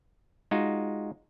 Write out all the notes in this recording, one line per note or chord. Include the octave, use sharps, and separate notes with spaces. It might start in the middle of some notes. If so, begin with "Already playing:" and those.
G#3 D#4 F4 F#4